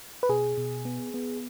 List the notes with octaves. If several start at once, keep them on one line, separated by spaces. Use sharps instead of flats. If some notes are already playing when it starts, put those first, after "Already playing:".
B4
B2 G#4
B2
B3
B3